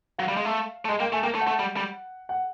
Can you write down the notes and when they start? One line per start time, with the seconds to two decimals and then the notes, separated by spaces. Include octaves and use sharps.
0.18 F#3 F5
0.28 G3
0.37 G#3
0.45 A3
0.85 A3
0.89 G#3 D#5
1.00 A#3 G5
1.13 A3 G#5
1.23 A#3 G5
1.35 A3
1.41 F#5
1.47 A3
1.59 G3
1.77 G3
2.29 F#5